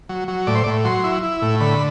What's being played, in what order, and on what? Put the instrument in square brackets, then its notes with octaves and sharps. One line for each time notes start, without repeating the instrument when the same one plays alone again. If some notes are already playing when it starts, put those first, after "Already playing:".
[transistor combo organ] F#3
F#3
A2 D5
C5
D5
A2
F#3 C6
E4
E4
A2
D3 B5